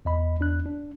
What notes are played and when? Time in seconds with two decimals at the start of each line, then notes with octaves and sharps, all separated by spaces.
0.05 E2 D#5 B5
0.39 E2 D4 F#6
0.66 D4